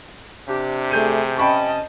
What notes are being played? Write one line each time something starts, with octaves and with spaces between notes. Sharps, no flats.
C3 D4 G4
A3 G#4 G6 D#7
C#4 D#5 G5 A5 B5 C#6